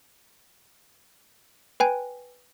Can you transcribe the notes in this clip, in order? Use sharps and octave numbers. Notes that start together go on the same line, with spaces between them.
B4 G5 G#5